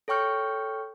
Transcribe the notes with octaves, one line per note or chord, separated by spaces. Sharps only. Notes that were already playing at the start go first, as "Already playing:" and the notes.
A4 C#5 G5 C#6 F6 G6